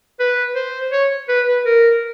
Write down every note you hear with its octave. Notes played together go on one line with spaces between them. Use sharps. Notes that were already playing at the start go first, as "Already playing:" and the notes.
B4
C5
C#5
B4
B4
A#4